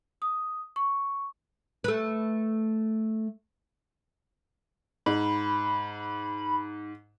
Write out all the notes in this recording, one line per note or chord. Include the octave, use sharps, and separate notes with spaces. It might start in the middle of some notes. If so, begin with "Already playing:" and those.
D#6
C#6
A3 B4
G#2 B5